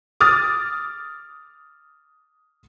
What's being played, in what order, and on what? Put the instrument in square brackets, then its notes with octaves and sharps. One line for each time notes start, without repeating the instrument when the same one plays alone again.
[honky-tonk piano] D6 D#6 F6 A6